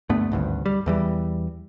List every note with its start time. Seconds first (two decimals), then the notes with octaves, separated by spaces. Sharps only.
0.09 D2 G2 A3 B3
0.32 G#1 D2 G2
0.66 G3
0.86 E2 E3 G3